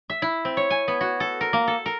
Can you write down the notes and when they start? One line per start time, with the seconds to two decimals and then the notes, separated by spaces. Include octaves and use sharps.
0.10 E5
0.22 E4
0.45 C4
0.57 C#5
0.70 G#5
0.88 B3
1.01 F#4
1.20 A4
1.41 A#4
1.53 A#3
1.67 A4
1.86 A#4